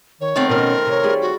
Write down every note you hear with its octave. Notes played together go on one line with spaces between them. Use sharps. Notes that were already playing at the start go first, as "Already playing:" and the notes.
D#3 C#5
D#3 A3 B3 C4
B2 F3 C#4 A#4
C3 C#5
G3 F4 G#4
F#4